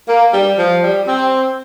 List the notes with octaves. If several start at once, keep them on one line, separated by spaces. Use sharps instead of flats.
A#3
G3
F3
G3
C4